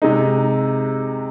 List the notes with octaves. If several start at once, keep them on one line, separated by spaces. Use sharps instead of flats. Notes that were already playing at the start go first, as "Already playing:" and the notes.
C3 G#3 D#4